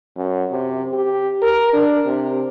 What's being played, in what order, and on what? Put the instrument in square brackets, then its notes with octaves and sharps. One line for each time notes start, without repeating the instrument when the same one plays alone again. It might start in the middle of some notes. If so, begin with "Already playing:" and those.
[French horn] F#2
C3
G4
A#4
D4
C3